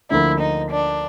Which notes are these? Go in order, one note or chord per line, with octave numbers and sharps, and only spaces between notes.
D2 D3 F3 A#3 E4
D#4
D4